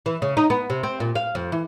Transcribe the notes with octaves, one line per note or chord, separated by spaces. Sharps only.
E3
C#3
D#4
B3
C3
C4
A#2
F5
F2
E3